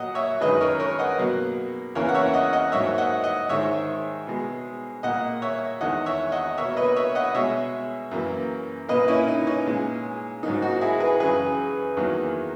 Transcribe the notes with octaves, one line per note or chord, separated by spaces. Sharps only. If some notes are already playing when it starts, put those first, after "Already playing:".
Already playing: A#2 F#3 A#3 D#5 F#5
C#5 E5
F#2 D#3 G#3 B4 D#5
A#4 C#5
A#4 C#5
D#5 F#5
B2 F#3 A#3
E2 C#3 E3 A#3 A#4 C#5
F#5
C#5 E5
D#5 F#5
D#5 F#5
G#2 F#3 A#3 C#5 E5
D#5 F#5
D#5 F#5
G#2 D#3 G#3 C#5 E5
B2 G#3
A#2 A#3 D#5 F#5
C#5 E5
E2 D#3 G#3 D#5 F#5
C#5 E5
D#5 F#5
B2 A#3 C#5 E5
B4 D#5
C#5 E5
D#5 F#5
B2 G#3 C#5 E5
F#2 E3 A#3
A#2 A#3 B4 D#5
C#4 E4
D#4
C#4
A#2 G#3
G#2 F#3 A#3 D#4
D#4 F#4
E4 G#4
G#4 B4
F#2 C#3 E3 G#4 B4
E2 D#3 F#3 A#3